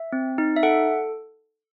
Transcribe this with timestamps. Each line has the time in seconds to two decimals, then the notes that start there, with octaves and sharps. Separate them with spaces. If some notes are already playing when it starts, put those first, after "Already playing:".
Already playing: E5
0.13 C4
0.38 D#4
0.56 E5
0.63 A4 F#5